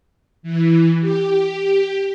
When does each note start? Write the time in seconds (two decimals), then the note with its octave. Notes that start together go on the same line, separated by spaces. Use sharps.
0.43 E3
1.00 G4